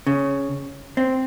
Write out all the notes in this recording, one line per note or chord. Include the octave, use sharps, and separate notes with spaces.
C#3
C4